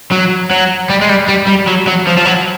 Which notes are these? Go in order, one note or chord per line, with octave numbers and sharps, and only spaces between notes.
F#3
F#3
G3
G#3
G3
G3
G3
F#3
F#3
F3
F3
F#3